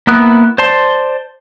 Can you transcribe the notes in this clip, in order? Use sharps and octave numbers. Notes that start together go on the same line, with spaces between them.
A#3 B3 E4 D#6 F#6
C5 D5 A5 C6